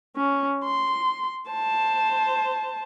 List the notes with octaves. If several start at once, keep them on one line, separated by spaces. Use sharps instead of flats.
C#4
C6
C5 A5